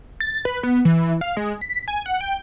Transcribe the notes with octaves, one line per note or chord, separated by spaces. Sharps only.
A6
B4
B3
E3
F5
G#3
B6
G#5
F#5
G5